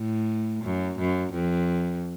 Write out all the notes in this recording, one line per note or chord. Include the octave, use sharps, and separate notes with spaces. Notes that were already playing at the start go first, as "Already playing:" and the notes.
Already playing: A2
F#2
F#2
F2